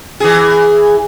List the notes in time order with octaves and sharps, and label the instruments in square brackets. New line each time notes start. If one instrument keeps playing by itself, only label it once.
[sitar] E3 G#4